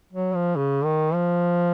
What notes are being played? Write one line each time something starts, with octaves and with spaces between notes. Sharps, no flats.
F#3
F3
C#3
D#3
F3